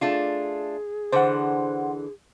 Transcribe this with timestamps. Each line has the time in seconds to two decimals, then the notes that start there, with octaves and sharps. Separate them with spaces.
0.01 A3 D4 F4 G#4
1.12 D3 E3 C5 F#5